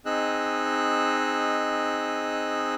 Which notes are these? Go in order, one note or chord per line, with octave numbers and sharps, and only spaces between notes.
C4 D#4 G#4 D#5 E6 F#6